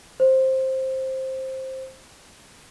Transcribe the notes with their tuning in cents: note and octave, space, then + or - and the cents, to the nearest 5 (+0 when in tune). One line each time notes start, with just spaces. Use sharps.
C5 +10